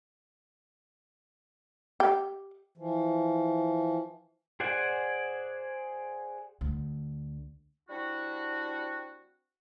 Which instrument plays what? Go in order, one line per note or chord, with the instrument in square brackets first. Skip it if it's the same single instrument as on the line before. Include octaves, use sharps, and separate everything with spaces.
[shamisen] G4
[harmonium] E3 F3
[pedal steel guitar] G#4 C5 D5 F#5 G#5
[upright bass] D2
[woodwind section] G3 C4 D4 E4 F#4